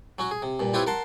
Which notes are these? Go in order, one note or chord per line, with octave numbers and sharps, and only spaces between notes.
F#3 C#4 F#4
G#4
C3
G2 A#2
C4 E4 F4 G4 B4 C#5
A#4 F#5 A5 C6